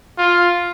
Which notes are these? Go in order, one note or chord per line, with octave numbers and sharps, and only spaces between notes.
F4